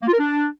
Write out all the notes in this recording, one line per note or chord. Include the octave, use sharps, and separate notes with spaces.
A#3
F4
A#4
D4